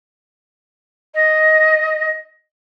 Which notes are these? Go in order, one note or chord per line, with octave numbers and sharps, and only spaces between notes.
D#5